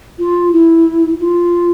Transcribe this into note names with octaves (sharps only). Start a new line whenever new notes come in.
F4
E4
F4